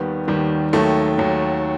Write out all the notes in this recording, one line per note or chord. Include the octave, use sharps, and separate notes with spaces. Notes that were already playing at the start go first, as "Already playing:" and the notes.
Already playing: D#2 D#3 G3 B3
D#2 D#3 G3
D#2 D#3 F#3 A3
D#2 D#3 F#3